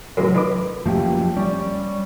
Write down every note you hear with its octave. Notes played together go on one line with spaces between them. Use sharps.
C#2 F#2 A2
D#4 B4 D6
F#2 F3 A3 A#3 G4
G3 C#4 D5